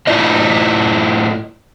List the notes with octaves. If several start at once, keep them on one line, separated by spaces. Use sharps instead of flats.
A2 E4 F4 D5 D#5